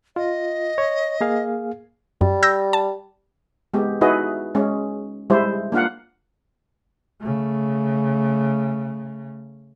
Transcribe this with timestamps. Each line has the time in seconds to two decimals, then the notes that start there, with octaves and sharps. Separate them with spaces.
0.16 F4 D#5
0.78 C#5
1.21 A#3 G#4 F5
2.21 F#2 G3
2.43 E6 G6 A#6
2.73 A5
3.74 G#3 B3 G4
4.01 D#4 E4 F#4 G#4 B4 D#5
4.55 G#3 C#4
5.30 G3 G#3 E4 C5
5.72 A#3 D4 F4 F5 F#5
7.21 C#3 A3